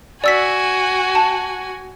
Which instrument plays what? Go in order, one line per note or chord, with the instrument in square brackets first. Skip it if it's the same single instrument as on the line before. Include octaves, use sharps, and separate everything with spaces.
[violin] F#4 G#5 [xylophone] D5 E6 B6
[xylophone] A5